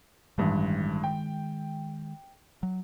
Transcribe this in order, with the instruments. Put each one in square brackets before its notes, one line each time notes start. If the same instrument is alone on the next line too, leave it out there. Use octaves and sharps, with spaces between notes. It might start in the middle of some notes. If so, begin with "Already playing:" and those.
[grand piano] A1 G2 [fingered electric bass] D#3 G#3
[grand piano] G5
[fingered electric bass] F#3